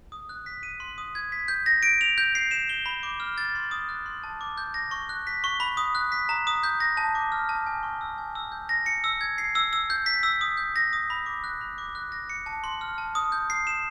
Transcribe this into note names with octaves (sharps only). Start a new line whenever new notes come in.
D#6
F#6
B6
D#7
C6
D#6
G#6
B6
G6
A#6
D7
F7
G6
C7
E7
G7
B5
D6
F6
A6
C6
D#6
F#6
C6
A5
D6
G6
A#6
C#6
F#6
B6
C#6
B5
D#6
F#6
B6
A#5
D#6
G6
A#6
A5
D6
F6
A5
G#5
C#6
E6
G#5
E6
G6
A#6
C#7
E6
G#6
C7
E6
E6
G6
B6
E6
D#6
G6
A#6
D#6
B5
D6
F#6
B5
D6
F#6
A#6
C#7
A5
C6
F6
A5
D#6
G6
C7
E7